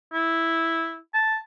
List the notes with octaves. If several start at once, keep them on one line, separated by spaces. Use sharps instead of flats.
E4
A5